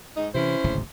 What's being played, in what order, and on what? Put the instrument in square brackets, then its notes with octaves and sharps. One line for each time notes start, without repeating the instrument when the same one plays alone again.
[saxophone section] G#2 D#4
[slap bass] C3 E3 [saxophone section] C#4 E4 C5
[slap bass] D1 G#1 C#3